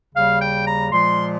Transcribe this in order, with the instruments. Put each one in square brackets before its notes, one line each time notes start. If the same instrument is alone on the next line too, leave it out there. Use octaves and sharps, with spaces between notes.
[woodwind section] D#2 C#3 G3 F5
G5
A#5
A#2 F3 G#3 C6